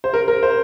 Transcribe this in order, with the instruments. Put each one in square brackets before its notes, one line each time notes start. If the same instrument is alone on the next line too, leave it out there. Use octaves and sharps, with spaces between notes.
[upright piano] C5
A#4
A#4
C5